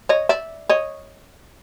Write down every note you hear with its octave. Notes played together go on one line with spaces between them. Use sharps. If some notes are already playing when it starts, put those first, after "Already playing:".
C#5 D#5
D5 E5
C#5 D#5